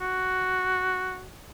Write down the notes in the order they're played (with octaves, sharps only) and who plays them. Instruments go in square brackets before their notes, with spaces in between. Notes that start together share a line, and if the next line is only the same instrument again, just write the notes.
[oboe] F#4